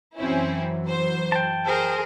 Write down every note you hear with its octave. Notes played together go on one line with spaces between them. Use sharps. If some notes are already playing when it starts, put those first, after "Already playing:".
F#2 E3 F#3 C4 C#4 E4
C5
G5 A5
G#4 A#4 C5